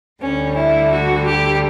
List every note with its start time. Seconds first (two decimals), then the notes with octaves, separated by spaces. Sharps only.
0.22 D2 D3 G3 C#4
0.57 E4
0.92 F#4
1.26 G4